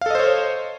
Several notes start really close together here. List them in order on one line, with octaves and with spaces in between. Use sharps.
F5 A4 D#5 C5 C#5